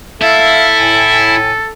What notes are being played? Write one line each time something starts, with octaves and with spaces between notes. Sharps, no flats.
E4 A4 E5 F5
A2 G#5